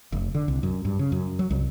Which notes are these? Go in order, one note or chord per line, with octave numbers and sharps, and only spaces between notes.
F1
D3
C2
F#2
G2
C#3
F#2
F#3
C2